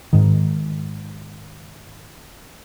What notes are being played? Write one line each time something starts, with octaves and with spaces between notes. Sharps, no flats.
G#2 D#3